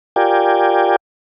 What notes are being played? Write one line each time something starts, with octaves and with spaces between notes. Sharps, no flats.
F4 G4 A#4 D5 G5 G#5